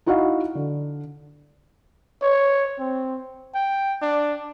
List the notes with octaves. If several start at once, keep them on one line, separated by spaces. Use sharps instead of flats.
D#4 E4 F#4 D#5 F5 F#5
D3
C#5
C4
G5
D4